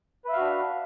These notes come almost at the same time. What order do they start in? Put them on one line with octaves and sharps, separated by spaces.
B4 E5 F5 F#4 D4